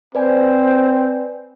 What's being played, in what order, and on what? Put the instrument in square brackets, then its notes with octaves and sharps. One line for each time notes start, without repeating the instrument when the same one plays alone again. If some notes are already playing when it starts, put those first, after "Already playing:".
[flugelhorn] C4 [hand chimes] B4 D5 G#5 [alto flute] C5